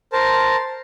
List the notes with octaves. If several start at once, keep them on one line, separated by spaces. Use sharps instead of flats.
A#4 C5 A5